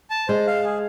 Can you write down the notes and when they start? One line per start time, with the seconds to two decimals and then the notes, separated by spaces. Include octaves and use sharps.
0.10 A5
0.28 G#3 C5
0.47 F5
0.64 G#4